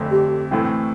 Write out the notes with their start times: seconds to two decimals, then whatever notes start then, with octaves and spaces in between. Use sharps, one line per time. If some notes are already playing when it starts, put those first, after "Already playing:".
Already playing: F1 F2 D3 A3 C4
0.11 G4
0.51 A2 E3 A3 C4